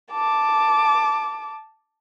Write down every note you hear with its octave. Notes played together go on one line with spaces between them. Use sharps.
A5 D6